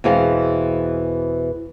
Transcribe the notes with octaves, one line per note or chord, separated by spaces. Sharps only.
E2 B2 E3 G#3 C4 F5